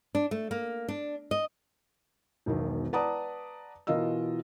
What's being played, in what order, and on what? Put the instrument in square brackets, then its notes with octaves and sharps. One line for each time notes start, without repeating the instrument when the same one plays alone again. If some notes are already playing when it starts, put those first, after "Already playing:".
[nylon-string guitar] D4
A3
A#3
D4
D#5
[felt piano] E1 B1 D#3
B4 D5 F#5 A5 A#5 D#6
B2 E3 F4 A#4 D#5 E6